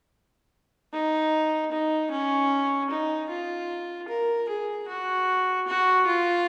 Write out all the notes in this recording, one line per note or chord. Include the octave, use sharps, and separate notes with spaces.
D#4
D#4
C#4
D#4
F4
A#4
G#4
F#4
F#4
F4